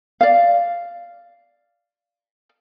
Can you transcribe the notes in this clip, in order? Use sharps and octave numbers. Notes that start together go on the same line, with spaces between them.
D5 F5